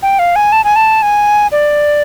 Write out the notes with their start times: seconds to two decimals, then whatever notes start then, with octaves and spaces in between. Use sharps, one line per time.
0.03 G5
0.19 F5
0.36 G#5
0.52 A5
0.64 G#5
0.76 A5
1.02 G#5
1.52 D5